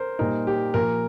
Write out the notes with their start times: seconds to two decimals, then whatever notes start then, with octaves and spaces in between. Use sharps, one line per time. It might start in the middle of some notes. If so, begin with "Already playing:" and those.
Already playing: A#4 C5
0.19 A#2 G3 A#3 D#4 A#4
0.47 G4
0.74 A#2 F3 A#3 A#4